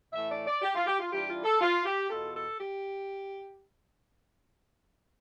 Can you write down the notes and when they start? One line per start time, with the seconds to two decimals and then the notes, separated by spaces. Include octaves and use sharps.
0.13 A2 E3 A3 E5
0.30 D5
0.47 D5
0.62 G4
0.75 F4
0.86 G4
0.99 F4
1.12 E3 G3 D4 F4 G4
1.28 F4
1.44 A4
1.61 F4
1.85 G4
2.10 E2 B2 B3 F4 A4
2.34 A4
2.59 G4